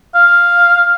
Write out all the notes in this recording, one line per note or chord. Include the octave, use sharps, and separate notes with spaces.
F5